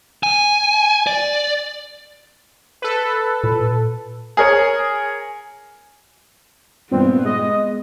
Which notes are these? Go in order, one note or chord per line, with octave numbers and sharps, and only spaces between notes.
G#5
D5
A4 B4
A#2
G#4 A#4 C#5
G2 A#2 B3 C4
G#3 D#5